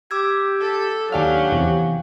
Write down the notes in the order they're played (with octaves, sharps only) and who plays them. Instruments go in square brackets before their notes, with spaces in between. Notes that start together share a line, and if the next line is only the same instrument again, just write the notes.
[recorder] G4 [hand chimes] D6 E6 G#6
[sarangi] A4
[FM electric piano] D#2 D4 F6 [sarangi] F#3 [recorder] G4 [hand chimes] F5 G5 G#5
[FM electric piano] E2 C3